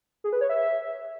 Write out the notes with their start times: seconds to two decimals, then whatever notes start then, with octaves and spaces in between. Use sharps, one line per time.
0.24 G#4
0.33 B4
0.41 C#5
0.49 E5